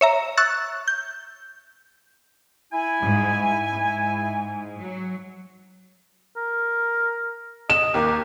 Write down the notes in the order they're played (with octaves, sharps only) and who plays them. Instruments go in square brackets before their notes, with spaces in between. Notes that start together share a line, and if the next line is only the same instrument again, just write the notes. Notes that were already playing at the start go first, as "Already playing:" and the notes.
[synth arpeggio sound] C#5 E5 A#5
C#6 E6 F#6 A6
G6
[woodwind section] E4 G#5
[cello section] G#2
G#2
F#3
[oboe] A#4
[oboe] D#5 [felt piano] E7
[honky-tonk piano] D#2 A#3 [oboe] G4